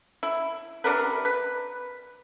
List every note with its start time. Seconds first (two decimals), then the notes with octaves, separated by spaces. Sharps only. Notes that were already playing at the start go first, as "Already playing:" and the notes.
0.23 E4
0.84 C3 D4 A#4 B4
1.25 B4